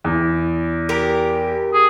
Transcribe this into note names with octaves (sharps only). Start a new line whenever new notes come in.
E2
G4 A#4
G#4